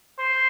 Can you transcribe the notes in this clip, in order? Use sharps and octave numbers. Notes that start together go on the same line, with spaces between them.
C5